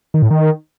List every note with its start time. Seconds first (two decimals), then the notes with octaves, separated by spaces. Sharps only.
0.14 D#3
0.22 A2
0.31 D#3